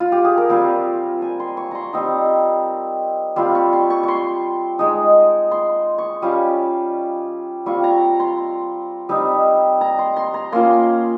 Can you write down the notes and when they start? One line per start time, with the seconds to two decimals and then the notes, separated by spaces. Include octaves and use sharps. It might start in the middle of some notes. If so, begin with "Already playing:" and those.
0.00 F4
0.12 G4
0.25 G#4
0.37 A#4
0.49 G3 C4 F4 C5
1.22 G#5
1.40 C6
1.57 C#6
1.71 A#5 C6
1.93 G3 C4 D#4 A#5
3.36 G3 C4 F4 C6
3.55 C#6
3.73 C6
3.90 C#6
4.03 C6 C#6
4.79 G#3 D#4
5.51 C6
5.98 C#6
6.22 G3 C#4 F4
7.66 G3 C4 F4 C#6
7.84 A#5
8.20 C6
9.09 G3 C4 D#4
9.81 A#5
9.99 C6
10.16 C6
10.34 A#5
10.52 A#3 C#4 F4 C6